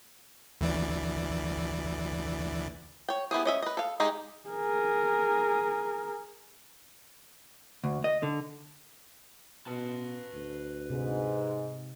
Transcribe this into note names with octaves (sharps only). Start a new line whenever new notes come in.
D2 E3 D5
C#5 G5
B3 E4 G4 G#4
C#4 D#5 E5
B4 D#5
A4 F5
G#3 D#4 G4 G#4
G#4 A#4
D2
D#5
D3
B2 B4 A5
D2
G#2 C3